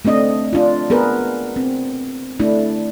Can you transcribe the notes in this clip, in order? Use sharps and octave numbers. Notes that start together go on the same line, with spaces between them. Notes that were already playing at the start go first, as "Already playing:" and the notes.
A3 C4 D4 D#5
D4 F4
B3 G#4 A#4 B4
C4
A3 D4 E4